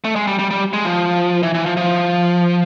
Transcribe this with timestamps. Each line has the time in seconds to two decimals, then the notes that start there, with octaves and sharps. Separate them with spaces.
0.04 A3
0.16 G#3
0.27 G3
0.39 G3
0.51 G3
0.73 G#3
0.85 F3
1.43 E3
1.54 E3
1.66 F3
1.77 F3